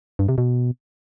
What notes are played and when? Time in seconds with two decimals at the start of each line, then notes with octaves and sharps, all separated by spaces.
0.19 G2
0.29 C3
0.38 B2